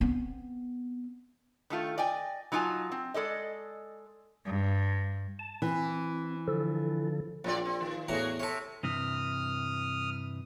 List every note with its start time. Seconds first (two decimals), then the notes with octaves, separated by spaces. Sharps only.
0.01 B3 C4
1.70 D#3 A3 F4 A4
1.98 D5 D#5 G5 G#5
2.52 F#3 D#4 F4 C#5 G#5 A5
2.92 C4
3.14 G#3 A4 D5 D#5
4.45 G2
5.39 A5
5.62 E3 C4
6.48 D3 F3 A4
7.44 A#1 F3 C4 D5
7.65 C4
7.81 D#3
8.08 E2 A2 F#4 G#4 A#5
8.40 C3 A4 C#5
8.83 G2 C3 E3 D#6 F6